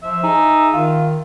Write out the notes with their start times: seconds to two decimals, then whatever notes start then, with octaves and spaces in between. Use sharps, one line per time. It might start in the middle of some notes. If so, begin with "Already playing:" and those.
0.04 F3 E5
0.23 D#4 G#4
0.73 D#3 F4